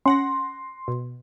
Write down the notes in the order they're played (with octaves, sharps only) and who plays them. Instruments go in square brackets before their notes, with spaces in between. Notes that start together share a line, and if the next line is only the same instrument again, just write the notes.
[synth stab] C#4 F#5 A#6 [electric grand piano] C6
[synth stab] B2